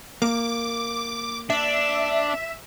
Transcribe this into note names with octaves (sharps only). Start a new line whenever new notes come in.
A#3 D6
D4 E5